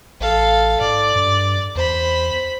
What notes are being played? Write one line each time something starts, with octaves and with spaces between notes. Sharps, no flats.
A1 A4 F5
G#2 D5
G2
E2 C5 B5